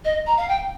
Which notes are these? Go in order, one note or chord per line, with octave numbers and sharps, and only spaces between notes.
D#5
A#5
F5
G5